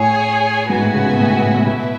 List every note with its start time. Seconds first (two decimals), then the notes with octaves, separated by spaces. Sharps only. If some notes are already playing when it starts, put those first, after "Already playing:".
Already playing: A2 G#4 C#5 G#5
0.70 G#2 B3 F#4 B4 E5 G#5
0.82 A2
0.94 C#3
1.06 B2
1.19 A2
1.30 A2
1.42 A2
1.54 A2
1.66 B2 E4 B4 E5